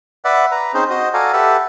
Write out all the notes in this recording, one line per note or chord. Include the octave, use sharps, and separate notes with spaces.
B4 D5 E5 F#5
B4 A#5
C4 C#4 D#4 G#4 C5
F#4 C5 D#5
F#4 A4 D5 F5 G#5 A#5
G4 A4 B4 E5 F#5